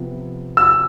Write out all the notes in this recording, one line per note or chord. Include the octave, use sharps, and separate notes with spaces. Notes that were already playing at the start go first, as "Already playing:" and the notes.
Already playing: C3 F3 B3
E6